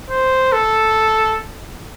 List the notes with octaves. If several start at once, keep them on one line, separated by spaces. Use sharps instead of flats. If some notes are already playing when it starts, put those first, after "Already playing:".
C5
A4